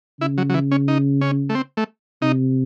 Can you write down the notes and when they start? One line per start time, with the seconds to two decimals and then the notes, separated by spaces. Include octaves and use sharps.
0.20 C#3 E4
0.38 F#3
0.50 F#3
0.54 E3
0.71 C#4
0.88 D#4
1.21 C#4
1.49 A3
1.55 C4
1.77 A3
2.22 C3 D#4